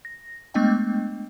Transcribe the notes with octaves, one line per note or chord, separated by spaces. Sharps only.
A#6
G#3 A3 B3 D4 D#5 G5